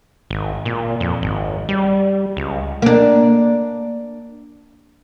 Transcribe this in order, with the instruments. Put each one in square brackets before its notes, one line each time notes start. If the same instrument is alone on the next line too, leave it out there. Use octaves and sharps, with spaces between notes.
[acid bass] G#1
A#2
F2
G#1
G3
C#2
[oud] A#3 D4